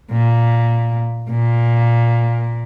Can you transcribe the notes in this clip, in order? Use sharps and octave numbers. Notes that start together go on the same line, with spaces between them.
A#2
A#2